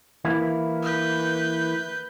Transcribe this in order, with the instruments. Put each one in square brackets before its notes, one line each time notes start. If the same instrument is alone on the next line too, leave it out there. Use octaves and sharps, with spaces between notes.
[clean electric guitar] E3 A#3 E4
[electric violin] B4 G6